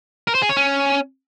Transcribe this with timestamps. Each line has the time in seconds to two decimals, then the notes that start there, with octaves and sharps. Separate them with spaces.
0.28 A#4
0.35 C5
0.42 G#4
0.49 C#5
0.57 C#4